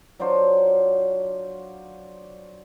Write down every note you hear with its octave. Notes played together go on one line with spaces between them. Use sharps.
F#3 D4 F4 C5